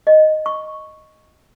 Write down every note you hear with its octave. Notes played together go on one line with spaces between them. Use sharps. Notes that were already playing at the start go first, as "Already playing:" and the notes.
D#5
C#6